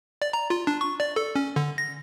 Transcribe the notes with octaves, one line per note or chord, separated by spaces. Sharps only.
D5
A#5
F4
D4
C#6
D5
A4
C#4
D3
A#6